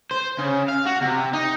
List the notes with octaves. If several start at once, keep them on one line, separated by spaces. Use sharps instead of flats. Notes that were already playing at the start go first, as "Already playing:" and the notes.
C5
C#3
F5
F#4
C3
D#4